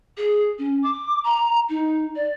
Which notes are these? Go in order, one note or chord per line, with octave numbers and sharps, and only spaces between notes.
G#4
C#4
D6
A#5
D#4
D5